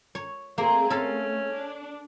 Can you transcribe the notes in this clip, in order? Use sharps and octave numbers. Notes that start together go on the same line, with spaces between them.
C#5
A3 A#3 C4 G#4
A3 C#4 A4 F5
D4